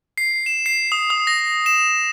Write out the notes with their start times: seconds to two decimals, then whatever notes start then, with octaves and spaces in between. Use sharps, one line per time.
0.18 C7
0.46 E7
0.66 C7
0.92 D#6
1.10 D#6
1.27 A#6
1.66 E7